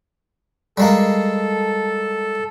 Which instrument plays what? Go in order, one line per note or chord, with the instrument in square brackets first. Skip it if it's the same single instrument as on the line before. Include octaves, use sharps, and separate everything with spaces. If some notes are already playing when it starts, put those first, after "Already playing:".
[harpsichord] G3 G#3 A#3 [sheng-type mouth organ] A4